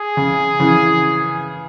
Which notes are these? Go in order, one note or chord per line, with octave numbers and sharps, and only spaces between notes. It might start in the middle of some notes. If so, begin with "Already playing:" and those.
Already playing: G#4
C#3
C#3 E3